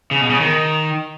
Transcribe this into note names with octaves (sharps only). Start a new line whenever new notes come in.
C#3
B2
C#3
D#3